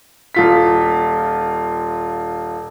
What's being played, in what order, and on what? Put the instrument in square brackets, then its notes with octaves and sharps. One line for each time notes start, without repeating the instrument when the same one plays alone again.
[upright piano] D#1 F4 B6